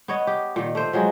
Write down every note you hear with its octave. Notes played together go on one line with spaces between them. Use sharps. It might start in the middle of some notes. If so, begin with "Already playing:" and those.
B3 C#5 D#5
G4
A#2 D#3
A3 C5
F3 F#3 G#3 D#5